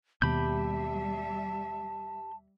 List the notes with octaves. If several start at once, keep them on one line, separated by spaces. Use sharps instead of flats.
D#2 B2 G3 G4 E5 A5 B5 G6